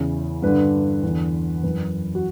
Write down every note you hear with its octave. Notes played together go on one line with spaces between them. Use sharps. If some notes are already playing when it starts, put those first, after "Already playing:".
Already playing: E2 C#3 E3
G2 D3 B4
E2 D3
F#2 E3 B4
F#4